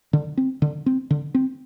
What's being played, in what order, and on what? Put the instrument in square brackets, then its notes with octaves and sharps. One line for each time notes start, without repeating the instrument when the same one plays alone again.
[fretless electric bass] D3
C4
D3
C4
D3
C4